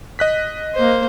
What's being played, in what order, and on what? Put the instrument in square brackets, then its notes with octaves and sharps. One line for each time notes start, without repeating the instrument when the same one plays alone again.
[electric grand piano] D#5 F#6 B6
[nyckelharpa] A#3 C5